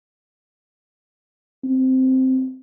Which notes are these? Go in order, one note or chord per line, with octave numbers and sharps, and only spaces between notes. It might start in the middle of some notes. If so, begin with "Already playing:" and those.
C4